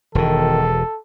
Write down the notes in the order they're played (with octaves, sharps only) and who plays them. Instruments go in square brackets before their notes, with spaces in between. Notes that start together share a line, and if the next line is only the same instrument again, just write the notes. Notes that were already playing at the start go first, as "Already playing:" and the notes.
[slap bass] E1 B2 [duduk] D#3 [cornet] A4